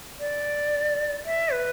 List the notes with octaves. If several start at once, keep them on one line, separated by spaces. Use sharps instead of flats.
D5
E5
B4